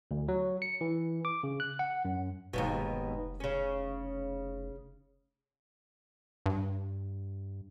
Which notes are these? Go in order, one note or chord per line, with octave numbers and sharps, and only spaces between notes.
D2
F#3
C#7
E3
D6
C#3
F#6
F#5
F#2
F1 D#2 G#2 B2
C#3 C#4
G2